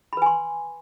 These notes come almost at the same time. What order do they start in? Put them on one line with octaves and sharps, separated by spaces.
B5 B4 G#5 C6